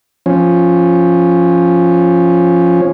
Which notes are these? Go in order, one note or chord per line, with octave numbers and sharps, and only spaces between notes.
F3 C#4